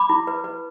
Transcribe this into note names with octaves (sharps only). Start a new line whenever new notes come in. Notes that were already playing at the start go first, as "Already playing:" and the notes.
Already playing: B5 D6
E4
B4
B4